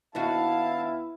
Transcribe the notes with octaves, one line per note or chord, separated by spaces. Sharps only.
D#2 B3 D4 E4 F#4 F5 A5